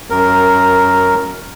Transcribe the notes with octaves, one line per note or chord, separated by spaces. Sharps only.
F#2 A#4